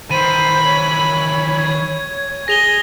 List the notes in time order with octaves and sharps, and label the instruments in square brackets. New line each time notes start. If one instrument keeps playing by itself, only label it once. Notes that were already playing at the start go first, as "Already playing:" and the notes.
[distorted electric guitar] D#3 E3 [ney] C5 [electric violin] B5 [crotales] D#7
[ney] C#5
[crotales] G#6
[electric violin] G#4 [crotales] A#6 F7 G7